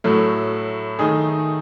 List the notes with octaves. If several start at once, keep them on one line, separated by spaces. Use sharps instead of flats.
A2 F#3 A3
D#3 A3 D#4 G#4